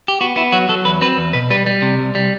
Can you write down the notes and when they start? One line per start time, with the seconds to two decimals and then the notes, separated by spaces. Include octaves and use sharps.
0.08 G4
0.21 B3 F#4
0.36 B3 E4
0.52 F#3 F#4
0.69 F#3 A4
0.85 E2 B4
1.01 C4 B4
1.18 E2
1.33 B2 B4
1.50 G3 B4
1.66 G3
1.82 C3
1.99 C2
2.15 G3